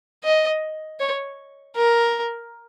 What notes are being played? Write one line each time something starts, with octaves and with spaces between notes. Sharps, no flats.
D#5
C#5
A#4